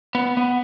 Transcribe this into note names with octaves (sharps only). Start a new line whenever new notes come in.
B3
B3